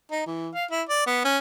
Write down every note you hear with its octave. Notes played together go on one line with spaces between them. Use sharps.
D#4
E3
F5
E4
D5
B3
C#4